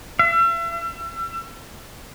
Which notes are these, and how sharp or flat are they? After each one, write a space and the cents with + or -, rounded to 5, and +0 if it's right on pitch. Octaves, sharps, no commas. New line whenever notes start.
E5 +40